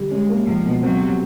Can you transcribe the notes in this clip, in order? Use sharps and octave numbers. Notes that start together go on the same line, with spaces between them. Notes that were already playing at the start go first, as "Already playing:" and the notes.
Already playing: D3 G3
G#3 C#4
A#3
C#2 F3
B2
F#3 C4
G3